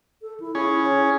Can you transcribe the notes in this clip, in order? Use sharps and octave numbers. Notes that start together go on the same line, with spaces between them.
A4
E4
C#4 E4 G#4
C#5